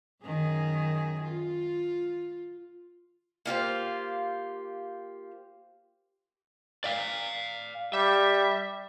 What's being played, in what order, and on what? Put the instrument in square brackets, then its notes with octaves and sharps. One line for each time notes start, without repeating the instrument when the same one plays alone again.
[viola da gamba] F#2 D#3 G#4
F4
[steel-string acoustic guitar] A#3 F4 G4 C5
[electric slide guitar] D5 F5
[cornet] G3 [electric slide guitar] E5